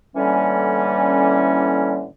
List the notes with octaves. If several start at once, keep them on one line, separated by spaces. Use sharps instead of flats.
A2 D3 E3 G3 A#3 C#4